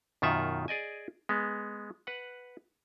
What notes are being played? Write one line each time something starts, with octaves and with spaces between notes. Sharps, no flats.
F#2 B2 D#3 F4 E5 F#5
G#4 D5 D#5 G#5
G#3 B3
B4 F#5